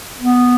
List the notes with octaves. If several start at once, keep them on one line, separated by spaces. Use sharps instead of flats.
B3